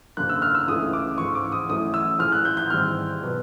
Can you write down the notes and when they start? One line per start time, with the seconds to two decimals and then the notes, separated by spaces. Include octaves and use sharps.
0.17 F#1 F#2 D3 F#3 A#3 F#6
0.29 E6
0.42 F6
0.55 E6
0.67 C#2 C#3 E3 A3 C#4 D#6
0.93 D6
1.18 A1 G#2 F3 C#6
1.35 D6
1.52 D#6
1.69 A1 A2 F#3 A3 C#4 D#6
1.94 E6
2.19 A#1 A2 E3 F6
2.32 F#6
2.45 G6
2.57 G6
2.70 G#1 G#2 E3 G3 F6
3.22 B2 F#3 B3